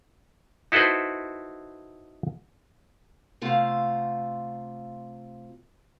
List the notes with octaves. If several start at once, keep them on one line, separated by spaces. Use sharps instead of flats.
D#4 E4 F#4 A4 B4 C5
C3 A3 F4 F5 F#5